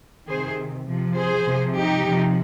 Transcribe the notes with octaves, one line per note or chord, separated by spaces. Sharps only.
C3 D#3 G#4 C5
C3 F3
G#4 C5
C3 F3
D#4 G4
C3 F3